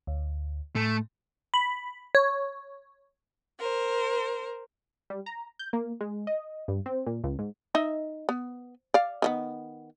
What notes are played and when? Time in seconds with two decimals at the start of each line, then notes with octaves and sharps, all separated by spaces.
0.07 D2
0.75 A2 A3
1.54 B5
2.15 C#5
3.59 A#4 C5
5.10 G3
5.26 A#5
5.59 G6
5.73 A#3
6.01 G#3
6.27 D#5
6.68 G2
6.86 C4
7.06 A#2
7.24 C#2
7.39 G#2
7.75 D#4 D#5 E5
8.29 B3
8.94 D5 F5
9.22 D#3 F3 B3